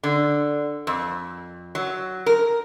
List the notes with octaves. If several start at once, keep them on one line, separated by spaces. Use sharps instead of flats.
D3
F2
F#3
A#4